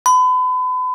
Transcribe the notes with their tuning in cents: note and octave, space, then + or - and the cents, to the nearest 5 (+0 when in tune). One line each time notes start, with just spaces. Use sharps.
B5 +35